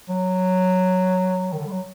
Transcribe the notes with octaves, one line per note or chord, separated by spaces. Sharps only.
F#3
D#3
D3
G3
F#3